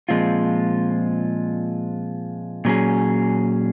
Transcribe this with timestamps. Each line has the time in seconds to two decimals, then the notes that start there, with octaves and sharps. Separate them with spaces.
0.09 A#2 F3 G#3 C4 F4
2.65 A#2 F#3 C#4 G#4